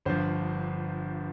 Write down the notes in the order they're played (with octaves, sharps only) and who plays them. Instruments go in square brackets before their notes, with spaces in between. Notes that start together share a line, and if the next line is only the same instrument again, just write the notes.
[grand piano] G1 G2 F3 C5